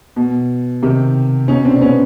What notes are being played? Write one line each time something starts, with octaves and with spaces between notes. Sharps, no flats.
B2
C3 D#3
B2 C#4 D#4
C4 D4
C4
B3 C#4